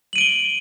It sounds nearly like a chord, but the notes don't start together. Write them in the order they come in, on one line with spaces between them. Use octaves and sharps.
F#7 D#7 D7 G7